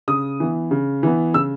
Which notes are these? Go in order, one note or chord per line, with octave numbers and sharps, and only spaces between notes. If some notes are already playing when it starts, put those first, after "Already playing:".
C#3 D#6
E3 B3
C#3
E3 B3
C#3 E6